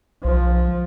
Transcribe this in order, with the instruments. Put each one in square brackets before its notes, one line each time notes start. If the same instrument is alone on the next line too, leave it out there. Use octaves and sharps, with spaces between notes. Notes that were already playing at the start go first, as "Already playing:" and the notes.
[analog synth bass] B1 [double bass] F3